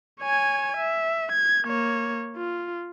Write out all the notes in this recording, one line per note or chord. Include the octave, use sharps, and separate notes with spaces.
C#5 G#5
E5
G#6
A#3 C#5
F4